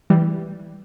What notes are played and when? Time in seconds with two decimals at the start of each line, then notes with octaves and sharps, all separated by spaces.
0.10 E3 G3